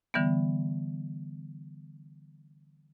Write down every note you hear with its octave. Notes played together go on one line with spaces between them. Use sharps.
D3 E3 G3 B3